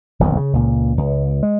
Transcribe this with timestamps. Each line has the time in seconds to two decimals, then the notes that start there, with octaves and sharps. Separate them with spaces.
0.20 D#1 B1 F2 D#3
0.37 C#3
0.53 C#2 A#2
0.97 C#2
1.43 G#3